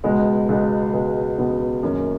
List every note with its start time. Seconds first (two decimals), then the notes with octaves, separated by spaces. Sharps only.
0.04 C#2 B2 G#3 B3
0.49 C#2 B2 G#3 B3
0.93 C#2 B2 G#3 B3
1.38 C#2 B2 G#3 B3
1.83 F#2 D#3 A#3 C#4